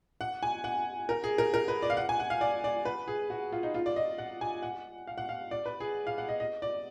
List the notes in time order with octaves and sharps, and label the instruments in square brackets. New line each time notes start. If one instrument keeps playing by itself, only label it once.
[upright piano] F#5
G#5
F#5
A#4
G#4
A#4
A#4
B4
D5
F5
F#5
G#5
F#5
F5
D5
D5
B4
G#4
F#4
F4
D#4
F4
D5
D#5
F#5
G#5
F#5
F5
F#5
F5
D5
B4
G#4
F5
F#5
D#5
D#5
D5